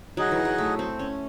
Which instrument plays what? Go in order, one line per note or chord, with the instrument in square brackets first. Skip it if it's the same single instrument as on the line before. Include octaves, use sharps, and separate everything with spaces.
[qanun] F#3 [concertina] D#4 G#4 D#5 F#5
[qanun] E3
F#3
A3
C4
C#4